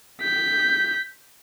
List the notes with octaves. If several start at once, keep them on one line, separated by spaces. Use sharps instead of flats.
G6 B6